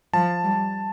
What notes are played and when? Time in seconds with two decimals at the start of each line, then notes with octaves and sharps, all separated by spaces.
0.14 F3 A5
0.44 G3